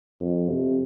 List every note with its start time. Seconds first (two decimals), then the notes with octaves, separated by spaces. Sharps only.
0.20 F2
0.50 C3